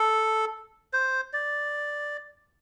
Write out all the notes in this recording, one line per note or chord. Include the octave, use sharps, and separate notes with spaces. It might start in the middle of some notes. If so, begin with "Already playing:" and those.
Already playing: A4
C5
D5